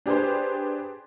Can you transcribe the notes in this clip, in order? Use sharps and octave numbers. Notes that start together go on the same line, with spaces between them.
D4 G4 G#4 B4 C5